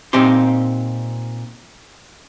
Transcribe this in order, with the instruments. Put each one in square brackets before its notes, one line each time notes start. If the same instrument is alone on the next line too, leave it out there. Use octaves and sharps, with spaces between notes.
[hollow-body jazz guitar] A#2 C4 D#4 G4 C6